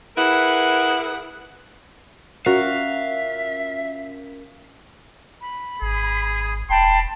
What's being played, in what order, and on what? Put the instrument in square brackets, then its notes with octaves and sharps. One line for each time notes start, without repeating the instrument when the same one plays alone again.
[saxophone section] E4 G#4 A#4 B4 F#5
[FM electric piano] C#4 F4 A#4 [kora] F#4 [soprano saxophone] E5 [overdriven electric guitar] F5
[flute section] B5
[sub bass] G#1 [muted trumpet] G#4
[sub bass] E1 [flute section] G5 A5 B5 [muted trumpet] C6